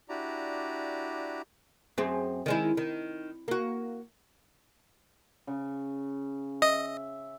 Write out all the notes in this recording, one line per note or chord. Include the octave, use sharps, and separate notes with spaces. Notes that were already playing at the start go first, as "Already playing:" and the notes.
D4 E4 F#4 G4 D5 A#5
F#2 C4 G#4
D#3 G#3 E4
D#3
A#3 F#4
C#3
D#5 E5